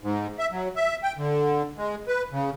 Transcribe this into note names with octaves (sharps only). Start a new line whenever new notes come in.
G#2
E5
F#3
E5
G5
D3
G#3
B4
C#3